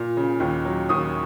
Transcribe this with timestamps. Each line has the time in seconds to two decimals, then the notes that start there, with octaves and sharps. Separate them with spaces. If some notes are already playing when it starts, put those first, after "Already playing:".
Already playing: A#2
0.17 C#3
0.40 D#2
0.65 F#3
0.89 D#2 D#6